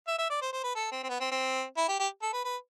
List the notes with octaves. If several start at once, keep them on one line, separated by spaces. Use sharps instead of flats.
E5
E5
D5
C5
C5
B4
A4
C4
C4
B3
C4
C4
E4
G4
G4
A4
B4
B4